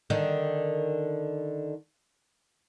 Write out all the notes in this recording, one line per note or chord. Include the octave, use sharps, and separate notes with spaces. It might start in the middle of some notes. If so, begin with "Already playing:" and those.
D3 D#3